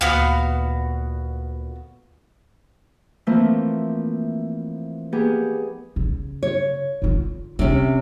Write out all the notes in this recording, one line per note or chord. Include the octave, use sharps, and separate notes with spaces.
D2 A#2 B3 F#4 F5
E3 F3 A3 A#3 C4 E4
A#3 B3 D#4 G4 G#4
C#3
C#5
D3 F4
C3 C#4 D4